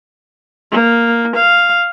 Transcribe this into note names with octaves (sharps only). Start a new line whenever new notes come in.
A#3
F5